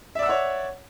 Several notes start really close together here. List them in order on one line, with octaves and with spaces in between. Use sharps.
E5 D5 E6 F#5 C#5